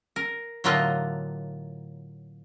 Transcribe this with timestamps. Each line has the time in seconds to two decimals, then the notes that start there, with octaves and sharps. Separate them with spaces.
0.16 A#4
0.64 A2 D3 F#3 A#3 F4 D#5